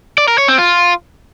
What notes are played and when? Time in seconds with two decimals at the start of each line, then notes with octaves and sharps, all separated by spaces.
0.18 D5
0.28 A#4
0.38 C#5
0.48 C4
0.58 F4